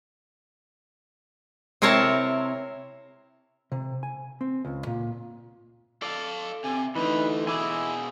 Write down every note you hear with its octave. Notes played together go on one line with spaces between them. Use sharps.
C3 C4 E4 A#4 C#5 A5
C3
G#5
C4
C#2
A#2
A4 D5 F5
C3 G#5
D2 D3 E3 D#4 B4
B2 E4 G#4 G#5 D6